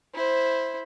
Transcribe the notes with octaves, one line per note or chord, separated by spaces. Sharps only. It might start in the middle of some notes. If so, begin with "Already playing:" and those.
E4 C5